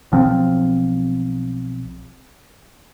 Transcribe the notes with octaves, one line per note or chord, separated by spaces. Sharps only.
B1 F3 C4